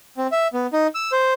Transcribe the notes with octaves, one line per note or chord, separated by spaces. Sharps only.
C4
E5
B3
D#4
E6
C5